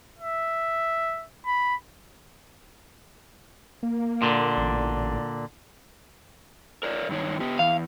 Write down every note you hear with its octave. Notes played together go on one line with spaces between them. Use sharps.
E5
B5
A#3
A#2 D3
A1
A#4 C#5 D5
G2 D#3 C#5
B3 G4
E2 F5